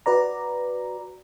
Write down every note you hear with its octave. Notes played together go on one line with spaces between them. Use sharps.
F#4 B4 D5 A#5